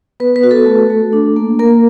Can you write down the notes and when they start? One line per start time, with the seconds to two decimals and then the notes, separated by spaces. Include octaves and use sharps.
0.20 B3 B4
0.36 B4
0.43 F#4
0.51 A4
0.66 A3
0.90 A3
1.13 D4
1.36 A#3
1.59 A#3 A#4